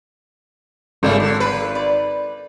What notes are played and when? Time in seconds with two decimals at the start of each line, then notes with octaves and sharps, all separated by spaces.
1.03 G#1 C#3 G3 A3
1.20 D3
1.40 B4
1.75 D5